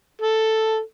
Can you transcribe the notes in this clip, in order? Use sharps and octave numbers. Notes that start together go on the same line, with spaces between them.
A4